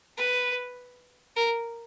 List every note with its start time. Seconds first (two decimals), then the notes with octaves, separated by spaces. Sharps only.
0.18 B4
1.36 A#4